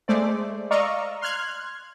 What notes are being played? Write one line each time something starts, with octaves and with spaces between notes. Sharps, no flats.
G#3 A3 C5 D5
D5 D#5 F5 A#5 C#6 E6
C6 F6 F#6 G#6